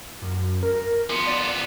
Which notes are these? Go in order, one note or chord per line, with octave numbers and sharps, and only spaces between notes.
F#2
A#4
F3 B3
D5